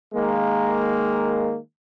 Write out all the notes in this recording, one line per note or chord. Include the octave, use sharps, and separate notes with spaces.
D#3 G#3 A#3